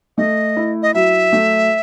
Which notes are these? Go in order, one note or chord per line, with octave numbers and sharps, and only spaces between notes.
A3 D#5
E4
D#5
F#3 E5
A3